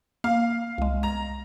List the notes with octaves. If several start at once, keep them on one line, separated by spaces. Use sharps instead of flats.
A#3 F5
C2 G#3
A#5